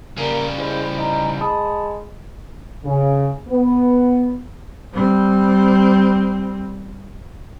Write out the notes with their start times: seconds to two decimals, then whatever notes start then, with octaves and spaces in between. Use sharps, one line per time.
0.17 C#3 G3 A#3
0.58 G#3 E4 C5
0.98 D#4
1.41 G#3 A5 B5 D#6
2.85 C#3
3.49 B3
4.93 G3 C4